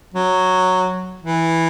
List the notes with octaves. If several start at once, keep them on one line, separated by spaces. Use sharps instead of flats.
F#3
E3